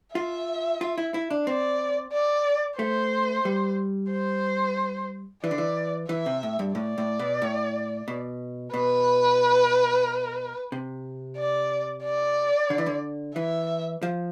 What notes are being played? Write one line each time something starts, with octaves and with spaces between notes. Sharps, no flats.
F4 E5
F4
E4
E4
D4
C4 D5
D5
A3 C5
G3
C5
E3 D5
D3
E3
E3 E5
C3
A2
G2
A2 D5
A2
B2
A2
B2
B2 B4
C3
D5
D5
D3
E3
D3
E3 E5
F3